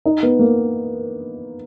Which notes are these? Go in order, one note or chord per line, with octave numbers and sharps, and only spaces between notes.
D#4
B3
A#3